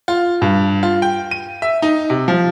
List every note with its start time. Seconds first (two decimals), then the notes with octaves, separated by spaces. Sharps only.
0.08 F4
0.42 G2
0.83 F4
1.02 G5
1.31 D#7
1.62 E5
1.82 D#4
2.10 C3
2.28 F3